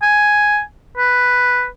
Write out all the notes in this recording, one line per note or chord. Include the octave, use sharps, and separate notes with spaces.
G#5
B4